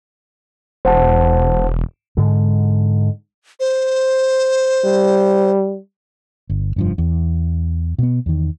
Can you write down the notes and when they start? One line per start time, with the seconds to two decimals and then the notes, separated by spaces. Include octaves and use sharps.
0.85 E1 C5 F#5 A5
2.17 G#2 D3 G#3
3.60 C5
4.85 G3
6.50 G1
6.76 F1 G2 F3
6.98 E2
7.99 B2 B3
8.26 E2 D#3